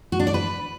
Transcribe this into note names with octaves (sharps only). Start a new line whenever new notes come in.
F#4
D4
D5
B4